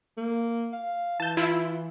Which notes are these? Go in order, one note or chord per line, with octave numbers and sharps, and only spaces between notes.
A#3
F5
E3 A5 G6
E4 F4